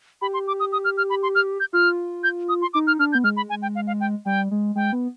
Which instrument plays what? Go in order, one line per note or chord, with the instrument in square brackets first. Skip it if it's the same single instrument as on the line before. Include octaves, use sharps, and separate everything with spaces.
[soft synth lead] G4 [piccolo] B5
[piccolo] C6
D6
D#6
D#6
F6
F6
B5
C6
F6
G6
[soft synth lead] F4 [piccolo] F6
[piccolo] G6
D#6
C6
[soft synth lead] D#4 [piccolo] D6
[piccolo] F6
[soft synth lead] D4 [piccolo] F6
[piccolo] G6
[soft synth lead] B3
[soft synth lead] G#3 [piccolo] F6
[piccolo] B5
G#5
G5
F5
F5
G5
[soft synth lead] G3 [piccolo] G5
[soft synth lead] G#3
[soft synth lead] G#3 [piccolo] G5
[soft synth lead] B3